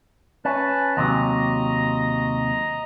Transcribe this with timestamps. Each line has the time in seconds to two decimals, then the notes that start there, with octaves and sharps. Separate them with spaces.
0.45 C#4 B4 A5
0.97 D#2 C3 F#3 D#5 A#5